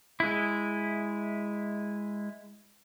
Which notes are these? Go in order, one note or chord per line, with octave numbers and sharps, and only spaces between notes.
G#3 E4